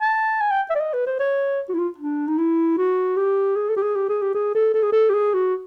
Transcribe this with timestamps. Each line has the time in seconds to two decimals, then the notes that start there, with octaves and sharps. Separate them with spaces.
0.01 A5
0.41 G#5
0.51 G5
0.70 E5
0.75 D5
0.80 D#5
0.93 B4
1.06 C5
1.19 C#5
1.69 F#4
1.74 E4
1.79 F4
1.98 D4
2.28 D#4
2.38 E4
2.78 F#4
3.16 G4
3.56 G#4
3.69 A4
3.77 G4
3.82 G#4
3.96 G4
4.09 G#4
4.22 G4
4.35 G#4
4.55 A4
4.74 A4
4.83 G#4
4.92 A4
5.10 G4
5.14 G#4
5.34 F#4